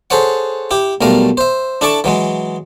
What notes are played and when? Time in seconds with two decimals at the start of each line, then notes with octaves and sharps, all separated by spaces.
0.10 G#4 A4 C5 C#5 F#5
0.71 E4 G4
1.01 B1 G3 A3 A#4 F5
1.37 C5 E5
1.81 D4 E4 A4 A5 C#6 D6
2.04 E3 F#3 G#3